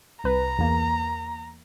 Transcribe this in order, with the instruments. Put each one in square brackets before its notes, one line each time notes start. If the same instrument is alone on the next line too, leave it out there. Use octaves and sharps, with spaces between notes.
[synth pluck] C2 B4 [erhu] A#5
[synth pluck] E2 A#3